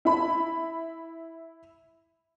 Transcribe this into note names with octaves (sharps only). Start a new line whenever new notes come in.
E4 B5